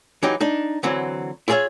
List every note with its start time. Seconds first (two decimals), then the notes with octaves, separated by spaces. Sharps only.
0.23 E3 F#3 D#4 G4
0.41 D4 D#4
0.83 D3 E3 F#3 C4
1.48 E4 F4 G#4 A4 C#5 E5